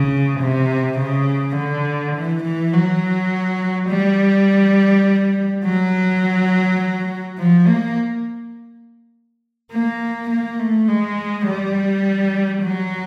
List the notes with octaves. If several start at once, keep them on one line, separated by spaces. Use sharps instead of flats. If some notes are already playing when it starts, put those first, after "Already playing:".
Already playing: C#3
C3
C#3
D3
E3
E3
F#3
G3
F#3
F3
A#3
A#3
A#3
A3
G#3
G3
F#3